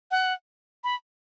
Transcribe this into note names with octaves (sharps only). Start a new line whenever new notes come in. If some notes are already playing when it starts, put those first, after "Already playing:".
F#5
B5